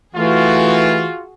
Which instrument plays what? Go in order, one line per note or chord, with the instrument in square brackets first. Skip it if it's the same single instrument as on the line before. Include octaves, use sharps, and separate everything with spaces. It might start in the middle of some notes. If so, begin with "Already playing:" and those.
[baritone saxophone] E3 [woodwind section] A3 [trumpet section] F4 [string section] F#4 G#4